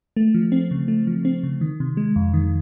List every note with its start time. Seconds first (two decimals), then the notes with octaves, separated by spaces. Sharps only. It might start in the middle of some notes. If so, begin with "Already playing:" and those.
0.17 A3
0.34 F3
0.52 C4
0.71 C#3
0.88 A3
1.07 F3
1.25 C4
1.43 C#3
1.61 D#3
1.80 C3
1.97 G#3
2.16 F2
2.34 D#3